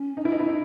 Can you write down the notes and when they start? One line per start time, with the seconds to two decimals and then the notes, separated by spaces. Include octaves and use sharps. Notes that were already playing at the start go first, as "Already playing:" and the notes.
Already playing: C#4
0.17 D#4
0.25 E4
0.32 D#4
0.40 E4
0.49 D#4